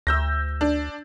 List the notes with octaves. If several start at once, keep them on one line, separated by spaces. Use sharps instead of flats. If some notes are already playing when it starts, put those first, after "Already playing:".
D2 E6 G6 A#6
D4